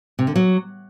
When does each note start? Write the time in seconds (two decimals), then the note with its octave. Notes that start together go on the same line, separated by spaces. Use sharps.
0.19 C3
0.27 D3
0.36 F#3